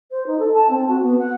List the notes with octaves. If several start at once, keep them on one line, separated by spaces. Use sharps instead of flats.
C5
D#4
A4
A5
C4
F#4
B3
F#5